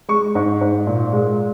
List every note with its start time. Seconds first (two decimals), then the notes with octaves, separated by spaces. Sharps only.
0.09 G#3 C#6
0.35 G#2
0.61 G#2
0.87 A#2
1.13 G#3